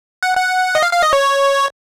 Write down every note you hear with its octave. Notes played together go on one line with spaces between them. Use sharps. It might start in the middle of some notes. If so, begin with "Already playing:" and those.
F#5
F#5
D#5
F5
F5
D#5
C#5